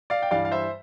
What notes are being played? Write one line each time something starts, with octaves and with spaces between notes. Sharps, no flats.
D5 F5
G5
G2 E3 G3 D5 F5
F5
C5 E5